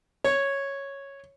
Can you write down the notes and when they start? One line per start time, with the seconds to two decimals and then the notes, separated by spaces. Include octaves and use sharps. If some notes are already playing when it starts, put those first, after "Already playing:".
0.24 C#5